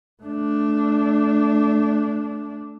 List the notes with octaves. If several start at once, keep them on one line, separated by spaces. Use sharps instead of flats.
A3 D4